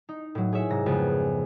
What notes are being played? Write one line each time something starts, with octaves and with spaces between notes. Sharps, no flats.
D#4
A2 F#3
G#4 C#5 E5
G#2 C3 A#6
F2 C#3 G#3 B3